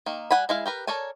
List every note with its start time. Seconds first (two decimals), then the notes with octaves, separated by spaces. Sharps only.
0.06 D#3 A#3
0.31 G3 F#5 G#5 B5
0.49 G#3 E4 F5
0.66 G4 A#4 B4
0.87 A4 A#4 C#5 D5 G#5